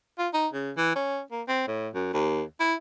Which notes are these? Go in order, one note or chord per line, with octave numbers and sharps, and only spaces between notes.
F4
D#4
C#3
E3
C#4
A#3
C4
A2
F#2
D#2
E4